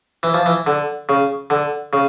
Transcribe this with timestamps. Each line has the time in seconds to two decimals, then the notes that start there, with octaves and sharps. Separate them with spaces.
0.23 E3
0.34 F3
0.46 E3
0.67 D3
1.09 C#3
1.50 D3
1.93 C#3